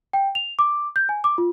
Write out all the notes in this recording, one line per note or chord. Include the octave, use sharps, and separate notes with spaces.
G5
F7
D6
G6
G#5
D6
F4